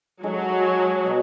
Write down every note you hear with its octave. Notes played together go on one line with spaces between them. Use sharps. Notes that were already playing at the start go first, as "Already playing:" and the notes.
F#3 G#3 D#4 A4
B2 G#3